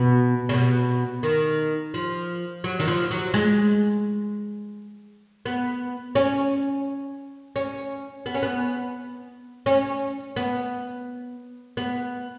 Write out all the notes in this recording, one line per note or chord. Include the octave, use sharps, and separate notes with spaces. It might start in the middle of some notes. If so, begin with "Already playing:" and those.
Already playing: B2
C#3
B2
D#3
F3
F#3
D#3
F3
F#3
G#3
B3
C#4
C#4
B3
C#4
B3
C#4
B3
B3